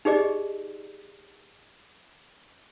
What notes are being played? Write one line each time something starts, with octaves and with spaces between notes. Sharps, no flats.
D#4 G4 G#4 D5 D#5